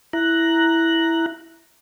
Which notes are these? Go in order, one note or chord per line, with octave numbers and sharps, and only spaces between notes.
E4 A#5 F#6